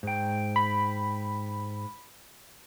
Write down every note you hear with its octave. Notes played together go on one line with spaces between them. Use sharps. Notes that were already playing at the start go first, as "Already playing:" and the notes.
G#2 G5
B5